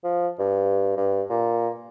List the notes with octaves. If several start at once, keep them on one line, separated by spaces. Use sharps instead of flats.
F3
G2
G2
A#2